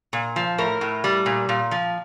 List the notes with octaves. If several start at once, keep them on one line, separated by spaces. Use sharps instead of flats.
A#2
F3
A2 A#4
A2
G3
A#2
A#2
F3